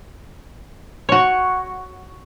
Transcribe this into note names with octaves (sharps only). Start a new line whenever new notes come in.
F#4 C#5